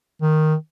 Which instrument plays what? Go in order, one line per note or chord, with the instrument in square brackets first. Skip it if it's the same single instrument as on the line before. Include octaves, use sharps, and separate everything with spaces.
[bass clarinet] D#3